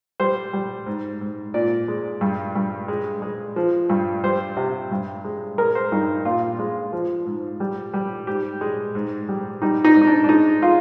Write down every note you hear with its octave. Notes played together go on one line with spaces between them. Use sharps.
G3 C5
G3
G#2
G#2
A#2 D5
G#3
G2
G2
G#3
G#3
F3
G2
G3 C5
C3
G2
G#3
G#3 A#4
C5
G2 D#4
A#2 F4
G#3
F3
G#2
G3
G3
G#2 G4
G#3
G#2
G3
G3 D#4
D#4
G#2
D#4
D4
D4
G#3 D#4
G#3 F4